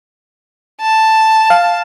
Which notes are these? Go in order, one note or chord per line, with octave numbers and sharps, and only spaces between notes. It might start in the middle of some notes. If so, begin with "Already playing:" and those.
A5
F5